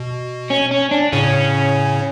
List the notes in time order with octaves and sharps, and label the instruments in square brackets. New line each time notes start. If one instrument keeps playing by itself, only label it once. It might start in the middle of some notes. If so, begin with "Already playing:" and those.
Already playing: [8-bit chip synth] B2
[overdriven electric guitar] C#4
C#4
D4
[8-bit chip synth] A2 C#3 [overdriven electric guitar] C#4